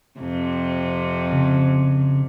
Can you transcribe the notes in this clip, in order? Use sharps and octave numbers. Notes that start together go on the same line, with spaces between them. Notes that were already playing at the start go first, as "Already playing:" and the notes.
F2 C3
C#3